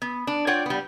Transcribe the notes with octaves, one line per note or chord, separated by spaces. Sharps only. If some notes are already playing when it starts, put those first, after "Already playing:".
B3
D4
F4 C#5 D5 F#5 G5
G3 B3